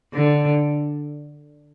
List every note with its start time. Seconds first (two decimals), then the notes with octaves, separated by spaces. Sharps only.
0.13 D3